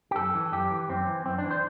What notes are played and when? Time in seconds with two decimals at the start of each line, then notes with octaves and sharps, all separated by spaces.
0.11 G4
0.16 F#2 A4
0.35 E3
0.52 F#2 G4
0.71 E3
0.89 F#2 C4
1.07 E3
1.26 F#2 C4
1.38 D4
1.44 E3
1.51 C5